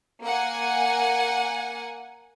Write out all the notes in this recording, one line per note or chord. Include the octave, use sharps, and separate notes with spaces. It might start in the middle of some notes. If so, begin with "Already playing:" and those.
A#3 F#5 G#5